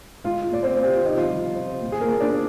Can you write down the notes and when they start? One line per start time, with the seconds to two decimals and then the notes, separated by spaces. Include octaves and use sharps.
0.24 G#3 F4 F5
0.51 A#2 D5
0.63 C4 C5
0.76 A#2
0.84 G4
0.95 F4
1.03 C3 D#4
1.17 F3 F4
1.29 G3
1.55 C4
1.81 A#2
1.92 G#4
2.01 A#3 A#4
2.08 A#2
2.20 D4 D5